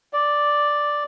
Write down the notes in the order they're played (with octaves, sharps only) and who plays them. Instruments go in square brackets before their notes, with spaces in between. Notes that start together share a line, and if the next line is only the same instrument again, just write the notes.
[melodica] D5